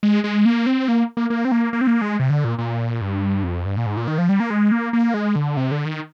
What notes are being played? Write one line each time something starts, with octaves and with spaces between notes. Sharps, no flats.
G#3
G#3
A#3
C4
A#3
A#3
A#3
C4
A#3
A#3
C4
A#3
G#3
C3
D3
A#2
A#2
G2
F2
G2
A#2
G#2
A#2
D#3
F3
G3
A#3
G#3
A#3
A#3
G#3
D3
C3
D3
D#3